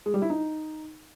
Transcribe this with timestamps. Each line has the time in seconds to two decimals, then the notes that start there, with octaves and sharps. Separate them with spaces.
0.06 G#3
0.14 G3
0.22 E4
0.30 D#4